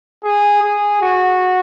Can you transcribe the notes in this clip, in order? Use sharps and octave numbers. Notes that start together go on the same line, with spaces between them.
G#4
G#4
F#4